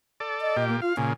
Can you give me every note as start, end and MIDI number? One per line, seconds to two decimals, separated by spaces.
0.20 0.57 69
0.20 0.57 74
0.41 0.64 75
0.57 0.80 46
0.57 0.80 67
0.68 0.77 58
0.82 0.93 65
0.82 0.96 77
0.97 1.13 46
0.97 1.13 49
0.97 1.11 80